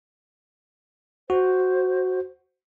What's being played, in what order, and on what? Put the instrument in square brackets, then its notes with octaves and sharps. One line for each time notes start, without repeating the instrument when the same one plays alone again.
[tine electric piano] F#4 [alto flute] C5